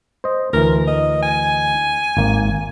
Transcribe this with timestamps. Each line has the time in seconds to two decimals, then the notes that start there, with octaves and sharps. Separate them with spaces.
0.24 C5 D#5
0.53 D2 E3 A#4
0.87 D#5
1.23 G#5
2.17 G#1 A#3